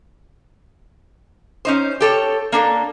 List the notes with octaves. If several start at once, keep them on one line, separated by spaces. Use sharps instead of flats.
C#4 D#4 C5
G4 A4 C#5
A#3 D4 A4